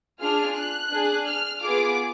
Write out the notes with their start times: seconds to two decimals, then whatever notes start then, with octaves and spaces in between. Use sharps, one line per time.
0.20 D4 F4 G#4 F6
0.55 F#6
0.91 D4 G#4
1.26 F6
1.63 B3 F4 G#4 D6